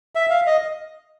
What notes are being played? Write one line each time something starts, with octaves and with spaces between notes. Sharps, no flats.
E5
F5
D#5